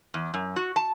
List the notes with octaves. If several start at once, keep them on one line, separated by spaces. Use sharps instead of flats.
E2
F#2
F#4
A5